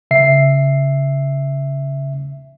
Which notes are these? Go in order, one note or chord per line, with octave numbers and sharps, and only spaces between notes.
C#3 E5 C7